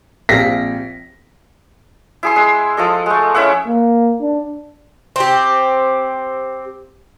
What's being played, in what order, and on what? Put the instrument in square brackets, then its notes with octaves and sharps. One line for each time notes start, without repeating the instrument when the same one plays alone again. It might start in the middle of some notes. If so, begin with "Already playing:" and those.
[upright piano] A#1 A#6 B6 [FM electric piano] C4 G4 F5
[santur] E4 G#4 C6
G#3 E6
F3 A4 D#5
G#3 A3
C#4 E4 E5 F#5
[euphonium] A#3
D4
[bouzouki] C4 G4